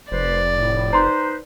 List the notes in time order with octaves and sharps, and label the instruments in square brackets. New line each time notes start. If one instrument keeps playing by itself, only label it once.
[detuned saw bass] F1 [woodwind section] B4 C5 [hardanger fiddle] D5
[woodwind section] A2
[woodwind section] D#4 B4 C5 [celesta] A#5 C6